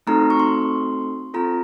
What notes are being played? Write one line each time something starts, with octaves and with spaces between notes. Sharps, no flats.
A3 C4 D#4 F#4 A4 A#5
C#6
C6
C4 F4 A4 A#5